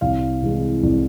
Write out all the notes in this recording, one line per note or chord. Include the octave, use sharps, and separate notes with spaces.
C2 F5
C3 E3 G#3
C2